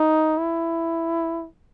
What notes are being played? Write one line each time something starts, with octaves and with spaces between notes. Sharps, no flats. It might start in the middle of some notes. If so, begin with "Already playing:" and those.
Already playing: D#4
E4